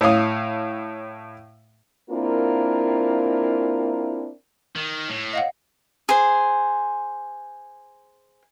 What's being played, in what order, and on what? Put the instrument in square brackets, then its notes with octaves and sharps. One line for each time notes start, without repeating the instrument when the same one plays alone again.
[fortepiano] A2 C#5 F5 D#6
[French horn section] A#3 C4 D4 E4 F4 A#4
[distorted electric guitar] D#3
A2
[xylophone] D#5 F5 F#5
[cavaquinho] G#4 C5